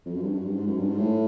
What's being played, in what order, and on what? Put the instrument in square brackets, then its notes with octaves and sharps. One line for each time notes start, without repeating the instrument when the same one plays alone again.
[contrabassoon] F2
F#2
G2
F#2
G2
G#2
F#2
G2
G#2
A2